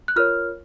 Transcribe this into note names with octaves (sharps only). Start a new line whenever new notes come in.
F#6
F4 A#4 C#5 F6